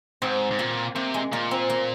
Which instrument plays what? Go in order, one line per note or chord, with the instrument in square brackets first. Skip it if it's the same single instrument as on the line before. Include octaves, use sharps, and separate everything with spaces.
[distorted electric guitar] G#2 [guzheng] C4
[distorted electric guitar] G#2
[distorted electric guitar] A#2 [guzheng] A#3
[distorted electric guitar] C3 [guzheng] A#3
[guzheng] G#3
[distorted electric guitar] A#2 [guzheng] A#3
[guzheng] C4
A#3